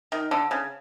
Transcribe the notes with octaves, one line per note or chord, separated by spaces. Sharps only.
D#3
D3
C#3